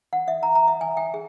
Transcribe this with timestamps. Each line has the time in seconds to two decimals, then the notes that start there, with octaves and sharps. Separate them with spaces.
0.13 F#5
0.28 E5
0.43 A#5
0.55 A#5
0.68 E5
0.81 G#5
0.97 G5
1.14 G#4